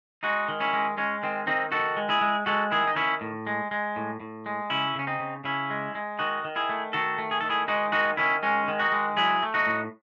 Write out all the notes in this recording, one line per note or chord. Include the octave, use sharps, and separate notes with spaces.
G#3 D#4 F#4
D#3
C#4 E4
G#3
G#3 C#4
D#3 C4
D#3 C4 D#4
D#3 F#4 A4
G#3
E4 G#4
G#3
G#3 F#4 A4
D#3 E4 G#4
D#4
D#3 C#4 E4
A2
G#3
G#3
A2
A2
G#3
C#3 C#4 E4
C#3 C#4
C4 D#4
C#3
C#3 C#4 E4
G#3
G#3
D#3 D#4 F#4
D#3
E4 G#4
A3
D#3 F#4 A4
A3
G#4
D#3 A4
E4 G#4
G#3 D#4 F#4
D#3 D#4 F#4
D#3 C#4 E4
G#3 C#4
D#3
D#4 F#4
G#3
F#3 E4 G#4
A3
D#4 F#4
A2